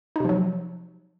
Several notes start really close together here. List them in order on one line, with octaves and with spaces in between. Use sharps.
D#4 C3 F3 F#3